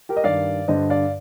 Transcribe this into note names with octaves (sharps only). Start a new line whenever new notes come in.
G4 A#4
D#5
G2 D#3 D5 F5
G2 D3 C5 D#5
D5 F5